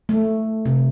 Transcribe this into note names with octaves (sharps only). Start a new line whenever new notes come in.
A3
C3